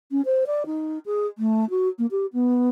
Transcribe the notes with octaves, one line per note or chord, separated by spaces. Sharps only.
C#4
C5
D5
D#4
G#4
A3
F#4
A#3
G4
B3